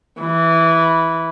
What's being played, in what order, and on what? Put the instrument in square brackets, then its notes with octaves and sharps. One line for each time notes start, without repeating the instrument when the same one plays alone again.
[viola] E3